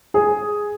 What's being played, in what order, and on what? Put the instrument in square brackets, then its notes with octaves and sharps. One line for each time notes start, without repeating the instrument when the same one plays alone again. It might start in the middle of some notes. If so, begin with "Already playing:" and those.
[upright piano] G#4